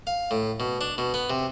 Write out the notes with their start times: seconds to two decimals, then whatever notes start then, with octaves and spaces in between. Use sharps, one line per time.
0.07 F5
0.31 A2
0.60 B2
0.81 D4
0.98 B2
1.14 B3
1.30 C3